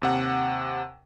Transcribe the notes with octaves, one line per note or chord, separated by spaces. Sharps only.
D#2 C3 F#5